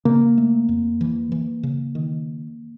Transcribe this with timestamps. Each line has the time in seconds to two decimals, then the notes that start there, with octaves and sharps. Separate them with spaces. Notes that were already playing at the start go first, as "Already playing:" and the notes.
0.05 C#3 A#3
0.38 A3
0.69 F2
1.01 E3
1.32 E3
1.63 C#3
1.95 D#3